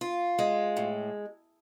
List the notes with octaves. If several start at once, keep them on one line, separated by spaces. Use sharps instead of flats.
F4
G#3
A2